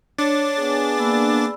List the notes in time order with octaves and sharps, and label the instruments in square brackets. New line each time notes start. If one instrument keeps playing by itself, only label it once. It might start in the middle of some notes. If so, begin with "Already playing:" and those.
[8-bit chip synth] D4 D6 A6 [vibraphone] C#5
[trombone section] B3 G#4
[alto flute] A#3 [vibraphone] D5 B5 E6